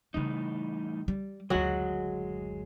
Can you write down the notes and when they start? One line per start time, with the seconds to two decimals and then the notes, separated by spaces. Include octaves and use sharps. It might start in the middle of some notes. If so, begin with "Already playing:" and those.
0.14 A2 C#3 E3 G3 D#4
1.08 G3
1.50 F#1 D2 F#3 G#3 F#4 G#4 D#5